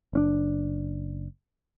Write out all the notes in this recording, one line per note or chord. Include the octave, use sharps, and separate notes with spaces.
F#1 C#4 D4